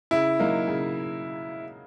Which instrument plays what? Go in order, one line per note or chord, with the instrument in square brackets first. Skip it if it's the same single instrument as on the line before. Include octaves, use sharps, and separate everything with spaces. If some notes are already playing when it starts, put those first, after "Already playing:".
[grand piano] C#3 [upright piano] E4
[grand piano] F#3 A#3 D#4
C#3